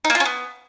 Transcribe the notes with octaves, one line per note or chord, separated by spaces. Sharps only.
D#4
A#3
F4
C#4
B3